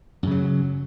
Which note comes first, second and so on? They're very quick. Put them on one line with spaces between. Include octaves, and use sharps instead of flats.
F#2 C#3 F#3